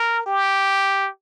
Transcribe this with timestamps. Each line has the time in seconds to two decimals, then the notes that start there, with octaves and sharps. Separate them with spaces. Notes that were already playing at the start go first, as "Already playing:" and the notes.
Already playing: A#4
0.26 G4